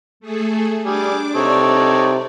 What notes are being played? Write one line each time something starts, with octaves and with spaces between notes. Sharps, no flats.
A3 G#4 A4
G3 D4 G#4 D6
C3 D#4 A4 C#5 D5